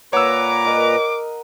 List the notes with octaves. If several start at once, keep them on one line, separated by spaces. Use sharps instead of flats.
A#2 B4 C#5 F#5 A#5 D6 E6
A#4 D#5